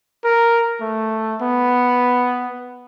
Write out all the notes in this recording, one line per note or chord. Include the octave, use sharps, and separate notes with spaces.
A#4
A3
B3